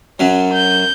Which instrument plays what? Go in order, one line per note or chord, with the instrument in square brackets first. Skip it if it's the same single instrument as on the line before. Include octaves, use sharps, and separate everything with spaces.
[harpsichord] F#2 F#3 [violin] C#4
[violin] G6